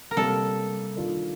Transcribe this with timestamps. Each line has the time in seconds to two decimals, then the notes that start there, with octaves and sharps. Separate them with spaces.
0.11 A#4
0.16 C3 G3 A#3 A4
0.96 D#3 A#3 D4 F4